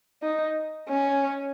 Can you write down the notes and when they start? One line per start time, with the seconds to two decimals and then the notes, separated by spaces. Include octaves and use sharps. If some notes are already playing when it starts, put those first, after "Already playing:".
0.22 D#4
0.88 C#4